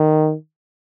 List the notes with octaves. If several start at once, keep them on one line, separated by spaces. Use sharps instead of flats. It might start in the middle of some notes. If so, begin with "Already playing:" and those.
Already playing: D#3